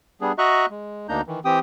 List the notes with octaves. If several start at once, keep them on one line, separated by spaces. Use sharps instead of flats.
G3 B3 D4 G#4
F#4 D#5 E5 A#5 C#6 F#6
G#3
D2 A#3 D4 D#4 A#5 G6
D#3 E3
E3 C4 G4 G5 D#6